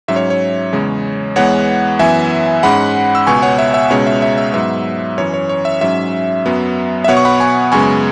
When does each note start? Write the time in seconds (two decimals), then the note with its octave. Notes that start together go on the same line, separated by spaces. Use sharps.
0.08 G#2 F#3 C#4 E5
0.16 C#5
0.30 C#5
0.73 E2 C#3 G#3
1.36 E2 E3 G#3 B3 C#5 F#5
1.99 F#2 E3 B3 E5 G#5
2.63 G#2 G#3 C#4 F#5 B5
3.15 E6
3.27 C#2 B2 B3 G#5 C#6
3.42 C#5 F#5
3.59 E5
3.74 E5
3.90 C#2 B2 G#3 C#4 C#5
4.07 E5
4.22 E5
4.38 E5
4.54 G#2 F#3 B3 E5
5.18 F#2 E3 C#4 C#5
5.34 C#5
5.49 C#5
5.65 E5
5.81 G#2 F#3 C#4 E5
6.46 F#2 F#3 B3
7.04 E5
7.08 B2 B3 C#5 F#5
7.17 C#6
7.25 F#5 B5
7.40 G#5 C#6
7.72 F#2 C#3 G#3 B3 G#5 C#6